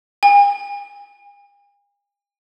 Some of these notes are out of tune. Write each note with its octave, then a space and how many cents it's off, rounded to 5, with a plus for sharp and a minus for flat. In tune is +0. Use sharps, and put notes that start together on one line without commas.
G#5 -45